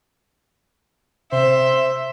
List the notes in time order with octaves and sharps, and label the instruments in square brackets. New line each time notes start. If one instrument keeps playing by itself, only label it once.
[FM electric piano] C3 [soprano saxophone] C5 [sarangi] E5